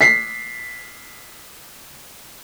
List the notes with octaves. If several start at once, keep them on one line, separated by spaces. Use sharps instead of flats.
B6 C7